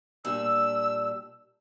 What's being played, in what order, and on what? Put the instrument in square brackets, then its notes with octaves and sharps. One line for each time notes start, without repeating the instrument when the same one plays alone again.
[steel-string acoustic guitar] A#2 G3 D4 [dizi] E6